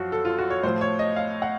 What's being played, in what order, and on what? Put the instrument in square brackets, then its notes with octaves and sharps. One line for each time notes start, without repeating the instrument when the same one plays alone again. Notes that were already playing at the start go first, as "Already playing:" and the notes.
Already playing: [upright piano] F#2 F3 F#4
A4
F4
F#4
C#5
A2 F3 C5
C#5
D#5
F5
F#5